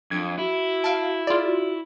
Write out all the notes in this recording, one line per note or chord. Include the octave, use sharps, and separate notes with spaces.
F2 D4 G#6
E4 F#4
F5 A5 D7
F4 G#4 D5
F#4